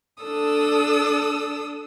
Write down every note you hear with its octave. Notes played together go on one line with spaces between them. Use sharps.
D4 A4 D#6 E6